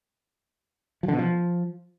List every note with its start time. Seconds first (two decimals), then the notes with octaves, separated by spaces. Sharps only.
1.03 F3
1.08 D3
1.13 B2
1.19 F3